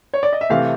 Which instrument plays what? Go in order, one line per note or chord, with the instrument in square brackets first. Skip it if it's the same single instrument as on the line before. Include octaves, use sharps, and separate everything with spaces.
[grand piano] C#5
D5
D#5
E5
C3 E3 A3 C4 F5